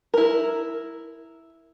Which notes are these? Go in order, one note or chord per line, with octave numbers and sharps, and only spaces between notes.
E4 A#4